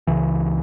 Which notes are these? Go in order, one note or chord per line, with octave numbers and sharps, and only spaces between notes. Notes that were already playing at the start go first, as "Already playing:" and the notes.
C#2 C#3 E3